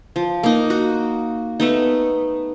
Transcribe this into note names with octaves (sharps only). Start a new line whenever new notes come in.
F3
A#3 D#4
F#4
A3 B3 D#4